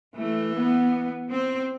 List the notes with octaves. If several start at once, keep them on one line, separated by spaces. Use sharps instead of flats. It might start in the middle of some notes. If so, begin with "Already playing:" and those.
E3 A3
B3
C4